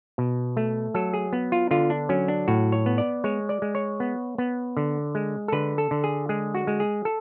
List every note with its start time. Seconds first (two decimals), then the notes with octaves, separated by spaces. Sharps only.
0.18 B2
0.57 A3
0.94 F#3 A4
1.13 G#4
1.33 B3
1.52 F4
1.71 D3 F4
1.90 D4
2.09 F#3 C#4
2.28 D4
2.48 A2 F#4
2.72 C#5
2.86 B3
2.98 D5
3.24 G#3 C#5
3.49 D5
3.62 G#3
3.75 C#5
4.00 B3
4.38 B3
4.77 D3
5.15 G#3
5.48 A4
5.52 D3 B4
5.78 A4
5.91 D3
6.04 G#4
6.29 G#3 G#4
6.55 F#4
6.67 G#3
6.80 G#4
7.05 A4